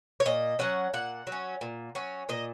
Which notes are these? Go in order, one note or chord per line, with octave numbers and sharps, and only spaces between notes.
C#5
A#2 D#5
F#3 C#4 F#5
A#2 F#5
F#3
C#4
A#2
F#3 C#4
A#2 D#5